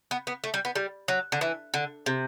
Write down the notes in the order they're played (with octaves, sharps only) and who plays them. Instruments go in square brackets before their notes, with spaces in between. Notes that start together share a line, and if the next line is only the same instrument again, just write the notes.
[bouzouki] B3
B3
A3
G3
B3
G3
F#3
D3
E3
D3
C3